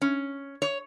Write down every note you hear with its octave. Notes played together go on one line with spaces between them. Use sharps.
C#4
C#5